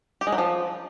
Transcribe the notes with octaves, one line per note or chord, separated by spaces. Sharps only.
G4
G#3
F#3
F3